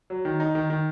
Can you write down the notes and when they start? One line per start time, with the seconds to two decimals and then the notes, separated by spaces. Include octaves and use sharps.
0.10 F#3
0.25 D#3
0.40 D#4
0.55 D#3
0.70 D#3